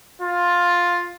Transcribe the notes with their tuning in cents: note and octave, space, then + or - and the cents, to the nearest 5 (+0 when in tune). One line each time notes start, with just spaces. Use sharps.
F4 +10